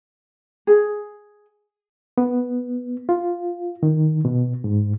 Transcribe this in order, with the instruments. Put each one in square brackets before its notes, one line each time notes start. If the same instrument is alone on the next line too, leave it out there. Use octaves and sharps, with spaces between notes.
[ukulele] G#4
[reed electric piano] B3
F4
D#3
B2
G#2